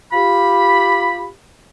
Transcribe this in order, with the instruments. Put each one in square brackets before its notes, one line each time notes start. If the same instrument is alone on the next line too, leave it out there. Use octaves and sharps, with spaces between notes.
[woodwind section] F4 G4 B5